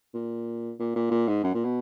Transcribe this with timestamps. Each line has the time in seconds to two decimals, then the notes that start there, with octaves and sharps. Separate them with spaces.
0.14 A#2
0.80 A#2
0.96 A#2
1.11 A#2
1.28 G#2
1.44 F#2
1.54 A#2
1.64 B2